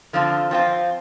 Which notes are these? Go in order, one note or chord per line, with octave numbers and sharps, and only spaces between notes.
D3 F3 C4 F4
F3 C4 F4